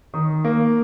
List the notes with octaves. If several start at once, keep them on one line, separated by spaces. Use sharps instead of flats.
D#3
A#3